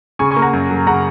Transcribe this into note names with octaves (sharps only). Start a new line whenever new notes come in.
C#3 G#5 C#6
G#5 C#6
A#3
F#5 A#5
F#2
F#3
C#3 F#5 A#5